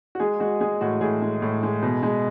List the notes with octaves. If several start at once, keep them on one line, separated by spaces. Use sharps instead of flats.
F#4
G#3 G#4
G#3 F#4
G#3 G#4
A2 F#4
A2 G#4
G#3
A2
G#3
B2
G#3